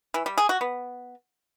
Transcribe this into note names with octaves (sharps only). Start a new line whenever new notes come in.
E3
G3
G#4
F#4
B3